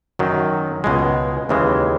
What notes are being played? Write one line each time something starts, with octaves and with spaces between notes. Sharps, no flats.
F#2 D#3 F#3
C#2 B2 G#3
D#2 C#3 E3 G#3